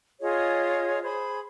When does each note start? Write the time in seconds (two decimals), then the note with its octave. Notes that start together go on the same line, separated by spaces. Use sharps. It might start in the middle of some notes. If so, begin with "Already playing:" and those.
0.21 F4 G#4 C#5 D#5
1.03 G#4 C5 B5